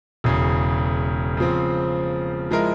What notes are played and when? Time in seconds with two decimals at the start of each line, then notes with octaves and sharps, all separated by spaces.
0.24 E1 E2 C#3
1.37 C#3 F3 C4
2.51 F3 G#3 E4 A#4